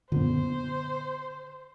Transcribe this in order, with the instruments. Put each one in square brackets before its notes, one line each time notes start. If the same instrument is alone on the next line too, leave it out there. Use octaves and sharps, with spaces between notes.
[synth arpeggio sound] F#2 A#2 [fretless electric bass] D3 B3 [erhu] C5